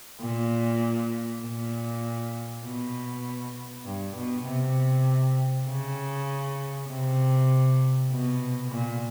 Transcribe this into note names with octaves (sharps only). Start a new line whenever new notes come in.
A#2
A#2
B2
G2
B2
C3
C#3
C3
B2
A#2